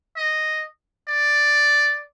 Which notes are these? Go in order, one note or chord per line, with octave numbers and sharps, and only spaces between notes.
D#5
D5